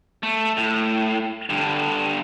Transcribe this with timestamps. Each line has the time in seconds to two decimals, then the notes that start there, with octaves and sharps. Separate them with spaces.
0.23 A3
0.57 A2
1.50 G2 D3